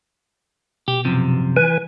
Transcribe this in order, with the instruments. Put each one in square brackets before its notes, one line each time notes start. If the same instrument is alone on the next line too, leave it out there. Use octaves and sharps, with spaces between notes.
[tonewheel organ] B2 [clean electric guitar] G4
[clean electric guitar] F#2 C3 F3
[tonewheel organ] E3 B4 G#5